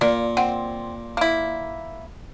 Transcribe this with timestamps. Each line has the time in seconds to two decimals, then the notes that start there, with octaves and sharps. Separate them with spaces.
0.01 A#2 A#3 D5
0.37 C4 F#5
1.17 A#3 E4